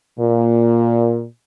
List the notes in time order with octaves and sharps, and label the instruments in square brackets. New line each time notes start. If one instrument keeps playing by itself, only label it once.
[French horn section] A#2